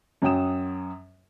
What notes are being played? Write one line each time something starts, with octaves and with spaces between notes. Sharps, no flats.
F#2 F#3 C#4 G5 D#6 E7